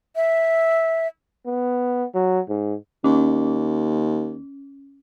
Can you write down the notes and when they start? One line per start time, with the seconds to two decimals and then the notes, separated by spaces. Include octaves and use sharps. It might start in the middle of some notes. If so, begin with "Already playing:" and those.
0.16 E5
1.46 B3
2.14 F#3
2.49 G#2
3.04 D#2 C#4